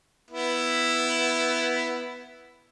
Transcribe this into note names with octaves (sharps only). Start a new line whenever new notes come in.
B3 E4